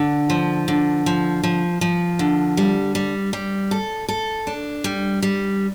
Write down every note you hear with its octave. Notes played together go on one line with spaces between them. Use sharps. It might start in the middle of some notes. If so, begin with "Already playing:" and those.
Already playing: D3
F3
D3
F3
F3
F3
D3
G3
G3
G3
A4
A4
D4
G3
G3